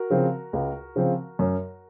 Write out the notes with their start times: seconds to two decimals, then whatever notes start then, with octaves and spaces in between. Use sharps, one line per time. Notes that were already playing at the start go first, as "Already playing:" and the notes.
Already playing: F#4 A#4
0.10 C#3 F3 C4
0.53 C#2
0.96 C#3 F3 C4
1.39 F#2